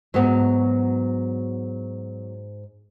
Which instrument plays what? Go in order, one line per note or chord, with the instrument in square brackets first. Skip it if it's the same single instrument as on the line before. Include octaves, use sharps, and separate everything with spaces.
[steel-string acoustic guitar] G#2 [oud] F#3 B3